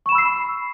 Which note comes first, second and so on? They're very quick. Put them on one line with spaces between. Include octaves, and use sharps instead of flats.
C#6 E7 B5 E6 C7